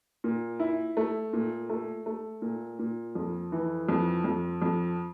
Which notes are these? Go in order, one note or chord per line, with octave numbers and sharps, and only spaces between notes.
A#2
E4
A3
A#2
A3
A3
A#2
A#2
F2
E3
F2
F2
F2